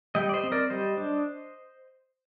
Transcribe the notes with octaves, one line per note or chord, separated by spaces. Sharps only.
G3 D#5 G5
D5
C5 D#5
C4
A#4 D5
G3 C5 D#5
D4